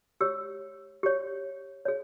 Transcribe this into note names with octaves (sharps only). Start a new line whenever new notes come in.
G4 C#5 E6
G4 C#5
G#4 C#5